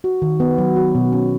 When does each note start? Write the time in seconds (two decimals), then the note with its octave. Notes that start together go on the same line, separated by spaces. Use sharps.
0.04 F#4
0.22 D#3
0.40 B3
0.58 F#3
0.76 F#4
0.95 B2
1.13 C#4